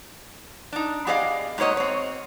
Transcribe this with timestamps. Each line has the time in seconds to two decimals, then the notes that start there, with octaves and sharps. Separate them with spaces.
0.72 D4 D#4
1.07 B3 G4 G#4 D5 D#5 F5
1.58 G#2 F#3 A#3 C#5 D#5
1.77 C4 C#5